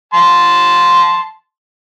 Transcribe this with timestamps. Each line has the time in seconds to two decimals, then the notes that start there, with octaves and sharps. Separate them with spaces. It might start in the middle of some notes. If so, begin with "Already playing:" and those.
0.14 A5 C6